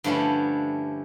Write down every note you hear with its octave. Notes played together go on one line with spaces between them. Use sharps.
G2 D3 F3 A3 C#4 E4